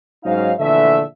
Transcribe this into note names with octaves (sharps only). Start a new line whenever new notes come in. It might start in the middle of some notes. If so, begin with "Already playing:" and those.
G#2 F#3 C#4 D#4 C5 F5
A#1 D3 E3 A3 E5